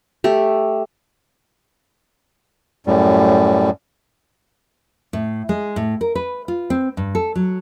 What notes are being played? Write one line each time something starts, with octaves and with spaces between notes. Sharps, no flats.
A3 G4
F#2 A2 G3
A2
G#3
A2
A#4
B4
F4
C4
G2
A4
F#3